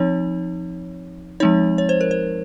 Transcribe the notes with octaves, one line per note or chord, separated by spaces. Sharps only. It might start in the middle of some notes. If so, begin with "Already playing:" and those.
Already playing: F3 C4 D#4 C#5
F3 G#3 C4 D#4 C#5
C#5
C5
A#4
C5